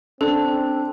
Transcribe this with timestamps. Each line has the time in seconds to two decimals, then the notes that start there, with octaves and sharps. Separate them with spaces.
0.21 C4 D4 A4